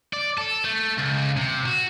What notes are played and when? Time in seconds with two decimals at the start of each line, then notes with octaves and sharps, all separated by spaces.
0.13 D5
0.38 A4
0.64 A3
0.98 C#2
1.37 C3
1.66 F#4